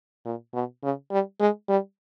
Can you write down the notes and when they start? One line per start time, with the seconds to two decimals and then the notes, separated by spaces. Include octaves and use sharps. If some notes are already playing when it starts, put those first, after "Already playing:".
0.25 A#2
0.54 B2
0.83 C#3
1.11 G3
1.40 G#3
1.69 G3